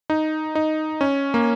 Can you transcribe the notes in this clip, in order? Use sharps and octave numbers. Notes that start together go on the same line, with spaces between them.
D#4
D#4
C#4
A#3